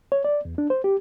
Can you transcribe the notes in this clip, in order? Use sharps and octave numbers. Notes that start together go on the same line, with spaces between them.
C#5
D5
E2
D4
C5
G4